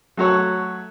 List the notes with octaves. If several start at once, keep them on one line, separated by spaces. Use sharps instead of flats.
F#3 A3 F#4 A4 C#5 F#5